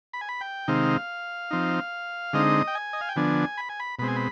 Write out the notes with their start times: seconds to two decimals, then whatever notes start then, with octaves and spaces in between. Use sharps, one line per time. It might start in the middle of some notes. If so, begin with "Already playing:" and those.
0.13 B5
0.21 G#5
0.29 B5
0.41 G5
0.68 C3 D#3 G#3 C4 D#4 F5
1.51 F3 C4 D#4
2.33 D3 G#3 C4 D#4 D#5
2.67 G5
2.75 G#5
2.93 D#5
3.01 F5
3.09 G5
3.16 D3 F3 B3 D4 G#5
3.57 B5
3.69 G#5
3.80 B5
3.99 B2 G#3 C4 B5
4.08 G#5
4.16 B5